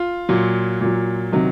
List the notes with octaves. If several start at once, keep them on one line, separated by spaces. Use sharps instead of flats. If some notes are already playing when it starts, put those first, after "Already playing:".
Already playing: F4
A#2 F#3
A#2 F#3
C3 D#3 F#3